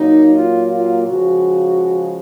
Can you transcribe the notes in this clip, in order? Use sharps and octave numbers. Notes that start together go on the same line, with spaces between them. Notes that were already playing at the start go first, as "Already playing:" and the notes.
Already playing: A#2 F#3 A#3 D#4
F4
F4
C#3 F3 G#3 F#4